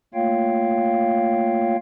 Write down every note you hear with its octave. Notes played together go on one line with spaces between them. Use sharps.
A3 A#3 F4 C#5 F5 G5